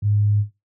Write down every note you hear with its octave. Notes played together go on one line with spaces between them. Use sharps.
G#2